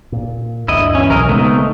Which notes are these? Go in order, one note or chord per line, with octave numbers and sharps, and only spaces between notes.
A#2
D2 G2 E4 D#5
E3 C#4
B1 E3 F#3 A#4 D#5
C#3 G#3 A3 B3 C4 D#4